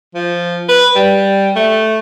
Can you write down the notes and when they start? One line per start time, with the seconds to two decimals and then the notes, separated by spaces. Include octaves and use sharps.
0.15 F3
0.69 B4
0.95 G3
1.56 A3